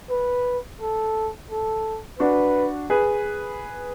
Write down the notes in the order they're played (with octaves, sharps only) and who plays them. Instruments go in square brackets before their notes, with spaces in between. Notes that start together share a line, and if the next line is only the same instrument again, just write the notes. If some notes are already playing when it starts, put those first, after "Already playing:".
[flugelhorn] B4
A4
A4
[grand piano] D4 F#4 [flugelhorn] B4
[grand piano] G#4 B4